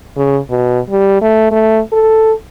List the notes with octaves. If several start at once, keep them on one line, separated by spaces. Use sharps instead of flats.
C#3
B2
G3
A3
A3
A4